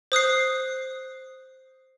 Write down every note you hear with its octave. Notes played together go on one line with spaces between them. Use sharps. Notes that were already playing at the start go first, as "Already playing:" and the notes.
C5 D#6 F#6 C7